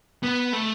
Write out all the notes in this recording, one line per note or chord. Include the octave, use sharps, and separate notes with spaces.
B3
A3